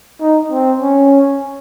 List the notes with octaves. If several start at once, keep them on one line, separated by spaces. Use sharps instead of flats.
D#4
C4
C#4